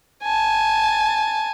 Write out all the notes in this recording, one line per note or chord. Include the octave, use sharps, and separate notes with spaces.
G#5 A5